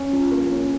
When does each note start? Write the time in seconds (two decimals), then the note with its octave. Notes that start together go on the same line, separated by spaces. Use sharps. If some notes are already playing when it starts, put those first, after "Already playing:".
Already playing: C#4
0.13 F3
0.31 A#3
0.51 C#4